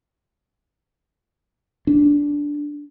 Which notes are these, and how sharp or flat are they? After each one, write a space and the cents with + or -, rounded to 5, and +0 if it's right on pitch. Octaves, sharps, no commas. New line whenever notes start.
D4 -10